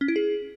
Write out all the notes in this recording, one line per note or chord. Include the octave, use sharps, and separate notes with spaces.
C#4
E4
G#4